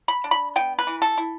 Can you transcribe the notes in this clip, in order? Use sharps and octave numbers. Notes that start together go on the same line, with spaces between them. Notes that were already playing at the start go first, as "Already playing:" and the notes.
B5
D4
B5
B3 G5
B4
E3
A4
E4